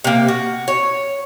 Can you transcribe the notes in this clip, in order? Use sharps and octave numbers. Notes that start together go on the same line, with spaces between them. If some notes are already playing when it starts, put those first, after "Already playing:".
C3 A#3
F#4
C#5